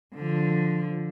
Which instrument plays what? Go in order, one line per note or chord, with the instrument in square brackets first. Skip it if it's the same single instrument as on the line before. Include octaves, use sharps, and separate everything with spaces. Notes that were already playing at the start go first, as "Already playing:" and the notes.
[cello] D3 F3